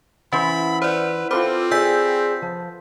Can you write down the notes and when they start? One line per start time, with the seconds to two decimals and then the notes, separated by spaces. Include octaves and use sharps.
0.32 E3 C#4 E4 C5 B5
0.82 B4 C5 D5 E5 F#5
1.31 C4 F4 A4 B4 C5 D6
1.71 G#4 D5 G5 E6 G6 B6
2.42 F3